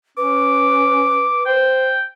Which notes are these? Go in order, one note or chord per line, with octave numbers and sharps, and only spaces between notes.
C#4 B4 D6
C5 G5